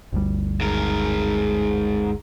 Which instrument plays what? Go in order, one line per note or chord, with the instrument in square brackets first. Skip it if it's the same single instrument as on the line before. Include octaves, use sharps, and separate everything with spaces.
[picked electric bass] G1 D2 G3
[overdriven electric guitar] G#2 A#4